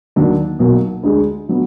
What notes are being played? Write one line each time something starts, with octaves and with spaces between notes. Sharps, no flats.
D#2 D#3 F#3 D4
B1 B2 F#3 A#3
D2 D3 G#3
D3 F#3 B3